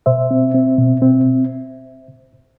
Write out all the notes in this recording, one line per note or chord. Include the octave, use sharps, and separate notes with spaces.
B2 C5 E5
C4
C4
B2
C4